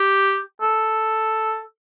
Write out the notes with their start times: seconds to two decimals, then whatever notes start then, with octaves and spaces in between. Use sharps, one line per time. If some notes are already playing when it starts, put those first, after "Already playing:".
Already playing: G4
0.61 A4